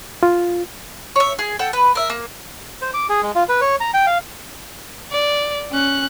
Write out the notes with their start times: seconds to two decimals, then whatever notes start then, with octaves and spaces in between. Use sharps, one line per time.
0.23 F4
1.16 C#5 E5
1.39 G#4
1.59 A4 F#5 G5
1.73 B4
1.95 A#4 E5
2.10 A#3
2.82 C5
2.94 D6
3.09 G#4
3.23 G#3
3.35 F4
3.49 B4
3.61 C#5
3.80 A#5
3.94 G5
4.07 F5
5.11 D5
5.72 C#4 F#6